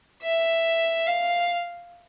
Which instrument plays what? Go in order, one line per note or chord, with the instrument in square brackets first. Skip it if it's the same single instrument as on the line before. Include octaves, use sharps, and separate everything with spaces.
[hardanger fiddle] E5
F5